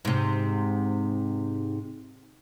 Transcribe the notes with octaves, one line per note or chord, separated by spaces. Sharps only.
G#2 C3